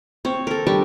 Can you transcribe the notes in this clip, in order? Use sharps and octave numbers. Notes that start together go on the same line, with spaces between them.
C4 C#5
A4 A#4
G3 D4 G4 C#6